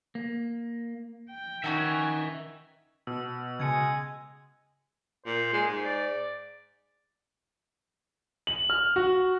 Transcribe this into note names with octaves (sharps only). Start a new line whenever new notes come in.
A#3
G5
D#3 C#4 D#4 F#4 E5 G#5
B2 E6
C#3 G#3 G#6 C#7
A#2 C5
G#3
G#2
D5
F#7
F6
F#4